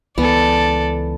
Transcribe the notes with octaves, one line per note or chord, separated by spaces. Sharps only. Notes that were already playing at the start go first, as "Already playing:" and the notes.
C#2 E3 B3 A4 D5